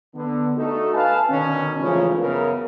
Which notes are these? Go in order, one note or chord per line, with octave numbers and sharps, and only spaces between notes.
D3 B3
A3 D#4 F#4 A4
B4 F5 G#5 A5
B2 D3 D#3 C#4
G#2 C#3 E3 F3 A3 C#4
F#2 C#3 B3 A#4